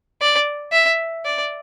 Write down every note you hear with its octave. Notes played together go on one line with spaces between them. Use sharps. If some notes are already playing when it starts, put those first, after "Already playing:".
D5
E5
D5